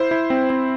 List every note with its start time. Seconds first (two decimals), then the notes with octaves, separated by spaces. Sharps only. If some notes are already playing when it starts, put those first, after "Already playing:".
Already playing: E4 C5
0.11 E4
0.30 C4
0.50 C4